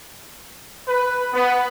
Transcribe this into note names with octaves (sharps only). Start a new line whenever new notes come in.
B4
B3